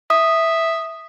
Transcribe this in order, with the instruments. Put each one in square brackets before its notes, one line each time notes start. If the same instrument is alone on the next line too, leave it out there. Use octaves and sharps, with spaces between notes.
[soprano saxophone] E5 [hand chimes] D#6